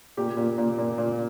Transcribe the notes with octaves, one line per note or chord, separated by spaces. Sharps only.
A#2 G4
A#2
A#2
A#2
A#2